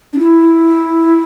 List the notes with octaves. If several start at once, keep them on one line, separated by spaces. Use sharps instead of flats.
D4
E4